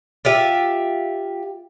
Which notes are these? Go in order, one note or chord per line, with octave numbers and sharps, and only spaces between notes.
F4 G4 E5